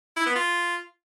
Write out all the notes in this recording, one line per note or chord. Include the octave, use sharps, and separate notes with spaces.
E4
B3
F4